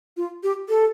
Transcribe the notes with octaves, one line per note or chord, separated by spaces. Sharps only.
F4
G4
A4